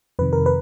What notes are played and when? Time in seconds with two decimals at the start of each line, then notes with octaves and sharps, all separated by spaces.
0.19 F2 C3 D#3 B4
0.33 A#4
0.46 B4